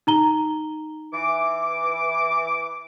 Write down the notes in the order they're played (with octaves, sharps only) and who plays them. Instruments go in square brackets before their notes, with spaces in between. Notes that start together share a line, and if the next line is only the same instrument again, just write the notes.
[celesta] D#4 A#5 G7
[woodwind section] E3 D6